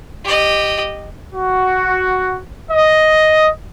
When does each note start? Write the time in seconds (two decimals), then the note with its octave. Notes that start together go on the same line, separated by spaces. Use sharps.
0.24 G4 D#5
1.33 F#4
2.71 D#5